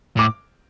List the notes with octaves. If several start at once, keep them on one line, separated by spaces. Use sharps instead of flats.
A2 D6